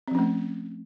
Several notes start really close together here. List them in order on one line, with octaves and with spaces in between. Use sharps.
C4 F3 C#4 A3